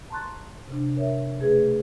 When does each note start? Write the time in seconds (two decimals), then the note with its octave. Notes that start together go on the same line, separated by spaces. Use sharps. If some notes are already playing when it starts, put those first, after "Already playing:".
0.10 A5 A#5 C6 C#6 F#6 A6
0.68 C3 D4
0.96 A#4 C#5 E5
1.39 B2 A3 G#4 B4 G#6